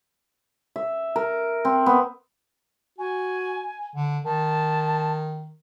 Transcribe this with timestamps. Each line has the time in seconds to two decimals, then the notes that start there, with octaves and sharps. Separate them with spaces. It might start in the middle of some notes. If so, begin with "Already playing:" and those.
0.76 E5
1.16 A#4
1.65 C4
1.86 B3
2.98 F#4 G#5
3.96 D3
4.25 D#3 A5